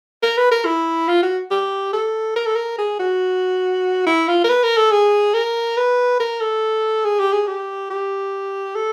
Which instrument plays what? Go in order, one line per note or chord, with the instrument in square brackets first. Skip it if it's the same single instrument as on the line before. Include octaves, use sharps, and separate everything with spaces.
[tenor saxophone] A#4
B4
A#4
E4
F4
F#4
G4
A4
A#4
A4
A#4
G#4
F#4
E4
F4
A#4
B4
A#4
A4
G#4
A#4
B4
A#4
A4
G#4
G4
G#4
G4
G4
A4